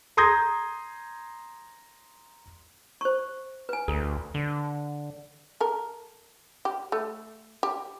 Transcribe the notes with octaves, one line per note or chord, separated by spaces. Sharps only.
A#5 C6 D#6 G6 G#6 A#6
C5 C#6
B4 G#5
D2 A4
D3
A4 A#4
G4
A3
G4